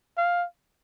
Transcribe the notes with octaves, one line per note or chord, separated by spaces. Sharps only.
F5